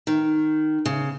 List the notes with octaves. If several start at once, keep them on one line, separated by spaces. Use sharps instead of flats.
D#3
C#3